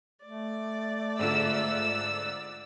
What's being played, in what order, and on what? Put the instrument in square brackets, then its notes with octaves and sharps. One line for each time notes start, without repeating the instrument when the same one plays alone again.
[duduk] A3 [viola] D5
[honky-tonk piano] G#2 D3 F4 [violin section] E6